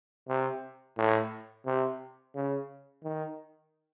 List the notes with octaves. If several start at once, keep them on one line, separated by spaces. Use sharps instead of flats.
C3
A2
C3
C#3
D#3